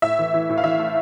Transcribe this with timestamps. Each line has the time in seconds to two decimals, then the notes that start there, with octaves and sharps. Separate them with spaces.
0.02 A2 E5
0.19 E3
0.34 E3
0.49 A2
0.58 F5
0.64 E3 E5
0.79 A3